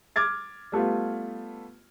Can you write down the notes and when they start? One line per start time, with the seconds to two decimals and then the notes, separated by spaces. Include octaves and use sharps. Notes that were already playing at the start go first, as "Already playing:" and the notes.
0.16 D6 F6 G#6 A6
0.72 G3 A3 B3 F4